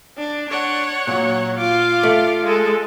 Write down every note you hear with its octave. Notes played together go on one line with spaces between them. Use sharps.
D4
D4 C#5 F#5
A#2 F#3
F4 F5 D6
A3
G#3 A4